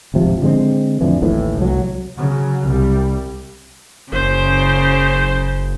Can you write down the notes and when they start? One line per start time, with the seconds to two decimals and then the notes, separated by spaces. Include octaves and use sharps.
0.14 D1 G#1 C3 F3
0.42 D3 G#3 C4
1.01 F2 A2 D3 E3
1.22 A1 D#2 A2 E3
1.58 C2 F#3
2.18 C#3 F#3
2.66 C2 G3
4.13 F#1 C#3 C5